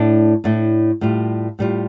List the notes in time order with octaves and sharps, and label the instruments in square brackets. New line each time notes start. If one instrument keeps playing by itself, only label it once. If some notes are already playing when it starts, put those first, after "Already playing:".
Already playing: [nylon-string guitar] A2 A3 D4
A2 A3 D4
A2 G3 F4
A2 G3 F4